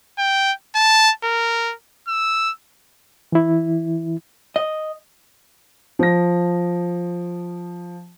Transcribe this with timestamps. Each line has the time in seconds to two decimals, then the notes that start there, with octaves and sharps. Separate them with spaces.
0.18 G5
0.75 A5
1.24 A#4
2.08 E6
3.32 E3 E4
4.56 D#5
5.99 F3 A#6